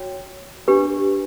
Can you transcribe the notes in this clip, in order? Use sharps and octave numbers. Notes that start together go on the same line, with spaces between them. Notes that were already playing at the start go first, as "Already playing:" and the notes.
Already playing: F#4 C#5 G5
D4 G4 B4